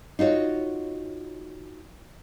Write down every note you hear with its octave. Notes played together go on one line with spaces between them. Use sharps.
D#4 F4 F#4 C#5